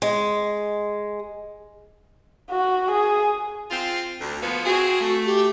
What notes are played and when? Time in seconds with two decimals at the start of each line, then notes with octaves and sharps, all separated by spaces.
0.02 G#3
2.51 F#4
2.91 G#4
3.71 C4 F4
4.21 D2
4.43 F3 A#3 B3
4.66 C4 F4 F#4 G#4
5.01 A3
5.26 G4